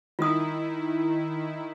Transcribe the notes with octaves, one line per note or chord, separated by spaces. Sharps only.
D#3 E4 F4 D#6